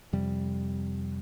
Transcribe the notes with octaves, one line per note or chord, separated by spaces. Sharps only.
F2 C3 G3